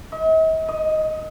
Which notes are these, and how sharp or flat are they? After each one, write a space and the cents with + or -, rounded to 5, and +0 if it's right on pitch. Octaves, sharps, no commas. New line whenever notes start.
D#5 +45
D#5 +5